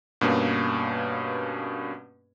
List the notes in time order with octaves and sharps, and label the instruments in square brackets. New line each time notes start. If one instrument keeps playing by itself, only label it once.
[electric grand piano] G2 B2 A#3 C#4